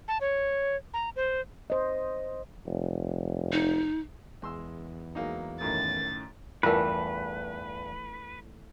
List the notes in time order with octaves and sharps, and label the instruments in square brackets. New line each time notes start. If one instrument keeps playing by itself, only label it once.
[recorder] A5
C#5
A#5
C5
[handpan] C5 D#5
[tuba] F1
[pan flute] D#4
[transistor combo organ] E2 [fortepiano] G#3 C6 E6
[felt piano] F#3 [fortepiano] G#3 A#3 D#4
[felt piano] F#2 A2 D#3 [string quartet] A6
[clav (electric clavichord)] E2 G2 [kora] E3 A3 [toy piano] F4 A#4 [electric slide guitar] B4